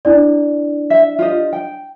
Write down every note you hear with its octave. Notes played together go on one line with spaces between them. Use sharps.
D4 E4 D5
E5
F4 G4 D#5
G5